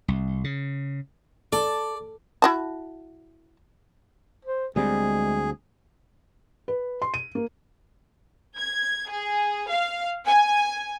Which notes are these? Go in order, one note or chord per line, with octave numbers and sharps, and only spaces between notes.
C2
C#3
A4 D5
E4 F#4 A5
C5
D2 G3 G#3 C4 G#4
B4
C6
D#7
A#3
G#6
G#4
F5
G#5